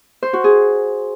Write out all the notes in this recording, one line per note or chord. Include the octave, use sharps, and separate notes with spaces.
C5
F#4
G#4